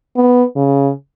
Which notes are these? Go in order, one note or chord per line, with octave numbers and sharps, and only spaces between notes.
B3
C#3